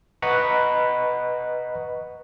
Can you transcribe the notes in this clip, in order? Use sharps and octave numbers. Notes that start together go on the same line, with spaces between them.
B4 D#5 F#5 A#5 B5 C#6